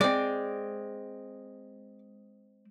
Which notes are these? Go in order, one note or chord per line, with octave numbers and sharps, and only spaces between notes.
G#3 C4 D5